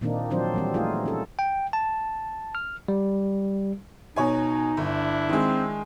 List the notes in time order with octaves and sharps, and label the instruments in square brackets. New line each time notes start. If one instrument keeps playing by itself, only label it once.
[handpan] A#2 D#3 A#3 C4 D4 D#4
D#3 F3 F#3 C4 D4 C5
E3 G3 C4
A3 D#4 F4 G#4
C#4 A4
[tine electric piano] G5
A5
F6
G3
[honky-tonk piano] B2 C#5 G#5 [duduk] D#4
[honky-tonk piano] G1 [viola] D4 E4
[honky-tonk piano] D#3 G#3 [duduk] C4